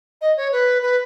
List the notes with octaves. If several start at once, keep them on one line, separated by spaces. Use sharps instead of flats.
D#5
C#5
B4
B4